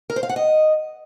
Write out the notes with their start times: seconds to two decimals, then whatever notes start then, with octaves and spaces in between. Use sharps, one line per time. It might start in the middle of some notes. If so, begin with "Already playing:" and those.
0.10 A#4
0.16 C5
0.23 F5
0.29 F#5
0.36 D#5